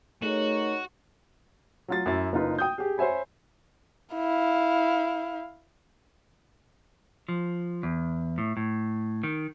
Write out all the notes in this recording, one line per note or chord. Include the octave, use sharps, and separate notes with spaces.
A3 D#4 F#4 G#4 A#4 C#5
F#3 F4 A6
F#2 E4 A6
F#1 D#4 F4 B4
G5 D#6 G6
G4 G#4
C5 C#5 E5 G#5 B5
E4 F5
F3
E2
A2
A2
D#3